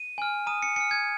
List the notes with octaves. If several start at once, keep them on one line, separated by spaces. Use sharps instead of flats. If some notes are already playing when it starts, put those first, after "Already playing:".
Already playing: D#7
G#5 F6
A#5 D#6 D#7
C#7
G#5 F6 C#7
G#6